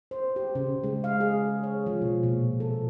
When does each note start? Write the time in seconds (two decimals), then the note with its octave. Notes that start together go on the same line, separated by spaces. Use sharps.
0.11 C5
0.36 G4
0.55 C#3
0.84 G#3
1.04 F5
1.20 G#4
1.63 C#5
1.86 F3
2.02 B2
2.23 A#2
2.60 A4